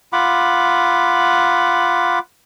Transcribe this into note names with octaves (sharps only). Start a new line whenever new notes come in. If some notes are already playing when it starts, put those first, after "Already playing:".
F4 F#5 B5 D6